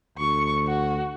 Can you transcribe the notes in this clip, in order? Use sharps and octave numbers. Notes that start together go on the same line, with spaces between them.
D2 C#6
F#4